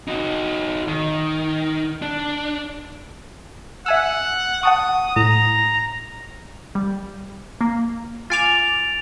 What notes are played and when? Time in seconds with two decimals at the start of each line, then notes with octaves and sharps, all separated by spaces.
0.08 D#4 F#4
0.88 D#3
2.02 D4
3.86 E5 F#5 G#5 E6
4.63 F#5 A5 C#6 D#6
5.16 A2 A#5
6.75 G3
7.61 A#3
8.30 F4 G#5 D6 A6 D7 F7